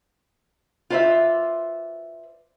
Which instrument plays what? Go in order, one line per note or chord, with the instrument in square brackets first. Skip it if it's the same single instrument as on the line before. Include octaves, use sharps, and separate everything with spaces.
[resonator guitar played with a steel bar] F4 B4 C5 D5 E5